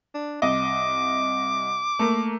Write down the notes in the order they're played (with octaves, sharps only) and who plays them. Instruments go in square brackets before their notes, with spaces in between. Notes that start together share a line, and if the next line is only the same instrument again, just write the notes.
[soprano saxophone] D4
[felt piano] C2 D#5 [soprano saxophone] D6
[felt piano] A3 A#3